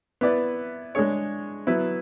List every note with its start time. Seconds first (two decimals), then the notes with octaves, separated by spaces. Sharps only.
0.21 B3 E4 B4 D5
0.95 G#3 D4 G#4 C#5
1.67 F#3 B3 E4 B4